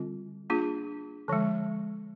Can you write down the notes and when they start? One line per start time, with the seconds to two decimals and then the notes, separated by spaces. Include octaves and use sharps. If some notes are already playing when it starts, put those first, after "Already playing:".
Already playing: D3 G3 C4 F4
0.50 A#3 D4 F4 G#4
1.28 D3 F3 G#3